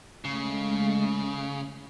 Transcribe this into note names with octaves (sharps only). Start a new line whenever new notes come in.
C#3 G#3 A3